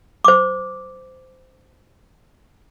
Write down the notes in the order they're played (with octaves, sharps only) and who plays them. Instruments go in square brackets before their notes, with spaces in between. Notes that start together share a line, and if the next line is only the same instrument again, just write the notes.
[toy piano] C5 D6